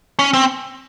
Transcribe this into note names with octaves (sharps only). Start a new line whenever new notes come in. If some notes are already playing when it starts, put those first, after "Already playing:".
C#4
C4